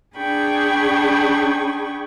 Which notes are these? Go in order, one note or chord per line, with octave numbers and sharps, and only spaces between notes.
D4 G#4 G5 B5 C#6